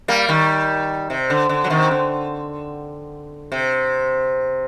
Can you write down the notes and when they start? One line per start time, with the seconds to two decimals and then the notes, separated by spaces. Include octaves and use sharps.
0.08 G3 A#3
0.29 D#3 G3
1.10 C3
1.30 D3
1.49 D3
1.64 F#3
1.70 C3 D#3
1.91 D3
3.52 C3